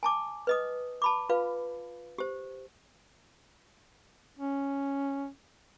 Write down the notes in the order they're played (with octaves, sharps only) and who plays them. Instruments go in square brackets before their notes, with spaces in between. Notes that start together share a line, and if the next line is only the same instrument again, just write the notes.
[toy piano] G#5 A5 D6
B4 D#5 D#6
A5 B5 D6
F4 B4 F5
G4 C5
[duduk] C#4